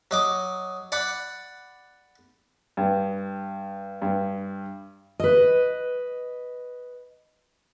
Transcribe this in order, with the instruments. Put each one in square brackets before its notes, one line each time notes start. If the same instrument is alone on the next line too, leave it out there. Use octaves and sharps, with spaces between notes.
[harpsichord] F#3 D#5 D6
D5 F#5 B5
[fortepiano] G2
G2
[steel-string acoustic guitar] B4 D#5